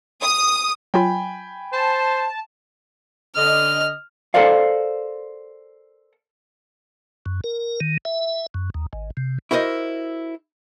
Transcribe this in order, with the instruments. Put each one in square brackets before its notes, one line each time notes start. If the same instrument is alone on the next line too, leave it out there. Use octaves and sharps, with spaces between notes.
[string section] D#6
[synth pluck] F#3 F4 [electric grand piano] G5 G#5 B5
[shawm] C5 [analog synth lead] A5
[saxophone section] D3 D#5 [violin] F6
[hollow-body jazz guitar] A4 A#4 C5 D5 F5
[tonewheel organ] F#2
A#4
D#3
E5
F#2
D#2
G#1
C3
[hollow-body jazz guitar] E4 F#4 A#4 C5 D#5